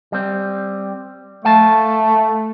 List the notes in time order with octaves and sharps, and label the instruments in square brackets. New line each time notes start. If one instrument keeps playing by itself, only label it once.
[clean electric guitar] G3 C4
[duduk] A3 [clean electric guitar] F5 A5